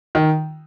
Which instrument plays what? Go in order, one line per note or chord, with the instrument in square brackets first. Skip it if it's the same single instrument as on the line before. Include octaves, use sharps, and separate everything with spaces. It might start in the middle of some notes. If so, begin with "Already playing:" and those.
[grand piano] D#3